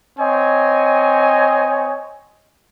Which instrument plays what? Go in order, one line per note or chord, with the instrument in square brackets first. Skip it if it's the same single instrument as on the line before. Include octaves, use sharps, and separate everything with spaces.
[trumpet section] C4 C#5 D#5 G#5